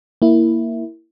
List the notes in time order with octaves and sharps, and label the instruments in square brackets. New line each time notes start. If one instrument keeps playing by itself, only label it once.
[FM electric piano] A#3 E4